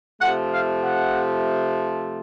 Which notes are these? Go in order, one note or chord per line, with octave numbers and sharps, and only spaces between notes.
C3 F3 A3 F#5
F5
F#5